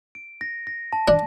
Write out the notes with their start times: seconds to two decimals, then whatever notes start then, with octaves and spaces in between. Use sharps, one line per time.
0.15 D7
0.41 A#6
0.67 A#6
0.93 A5
1.08 D4